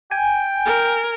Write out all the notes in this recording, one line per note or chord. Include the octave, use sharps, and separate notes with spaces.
G5 G#5
A#4